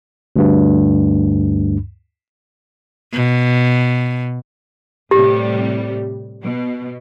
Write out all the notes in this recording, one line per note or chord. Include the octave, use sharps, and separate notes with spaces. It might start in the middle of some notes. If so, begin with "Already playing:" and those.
D2 G2
B2
A2 C3 G3 G4
B2